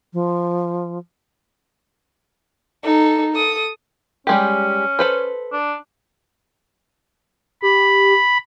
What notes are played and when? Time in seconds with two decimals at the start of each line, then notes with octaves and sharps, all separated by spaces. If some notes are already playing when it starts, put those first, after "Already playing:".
0.13 F3
2.83 D#4 A4
3.34 A4 D#6
4.27 G3 G#3 C#4 G4
4.99 A4 B4 C5
5.53 D4
7.62 G4 B5